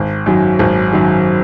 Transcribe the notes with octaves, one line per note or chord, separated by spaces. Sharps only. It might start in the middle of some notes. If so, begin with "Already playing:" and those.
Already playing: G#1
F#2 D#3 F#3
G#1
F#2 D#3 F#3